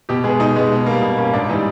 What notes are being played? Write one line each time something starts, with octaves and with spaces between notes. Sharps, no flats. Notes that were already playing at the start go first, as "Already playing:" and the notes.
B2 G4
G#3 B3 G#4
B2 D#4
G#3 B3
B2
G3 A#3
B2
G3 A#3 C#4
G#2 D4
E3 G3 D#4